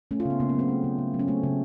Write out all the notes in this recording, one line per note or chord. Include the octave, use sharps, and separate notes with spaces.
A3 C#4
F4
C#3 B3
C#3 A#3
B3
F#3 C4
A3
C#3
C#3
F#3
C#4
A3 C4
C#3